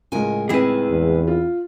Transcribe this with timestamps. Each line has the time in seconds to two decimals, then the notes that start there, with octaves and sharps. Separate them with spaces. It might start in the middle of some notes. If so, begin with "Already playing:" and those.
0.12 C#2 A2 G#3 A#4 G#5
0.49 C4 E4 G#4 B4
0.90 E2
1.28 F4